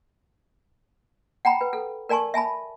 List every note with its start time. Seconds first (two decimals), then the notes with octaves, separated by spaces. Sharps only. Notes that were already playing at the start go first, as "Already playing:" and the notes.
1.45 F#5 G5 A#5 B5
1.61 B4
1.73 A4
2.09 A#4 D5 G#5 A5 C#6
2.34 E5 G#5 A5 B5